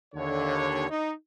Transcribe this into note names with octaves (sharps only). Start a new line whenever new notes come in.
D#2 D3 C#5
D#4